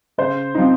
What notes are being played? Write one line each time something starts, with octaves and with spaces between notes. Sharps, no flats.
C#3 C5
F3 C4 D#4